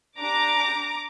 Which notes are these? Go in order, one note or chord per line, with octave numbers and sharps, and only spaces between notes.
D4 G4 A#5 D6